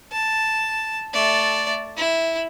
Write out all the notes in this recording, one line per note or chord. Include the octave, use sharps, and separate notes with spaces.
A5
A3 D5
E4